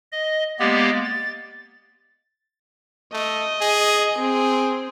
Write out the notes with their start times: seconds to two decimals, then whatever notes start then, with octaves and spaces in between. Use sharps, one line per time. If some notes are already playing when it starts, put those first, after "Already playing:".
0.12 D#5
0.60 G#3 A#3 B3 G4 D5
1.04 A6
3.13 A3 D#5
3.61 G#4
4.19 C4 G#4